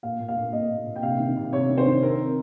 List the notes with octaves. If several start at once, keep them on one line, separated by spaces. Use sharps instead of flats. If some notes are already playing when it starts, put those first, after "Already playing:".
A#2 F5
A#2
F5
A#2
A#2 D#5
A#2
A#2
G5
C3 F5
D#3
C3
C3 C#5
D#3
C5
D#3
C4 A#4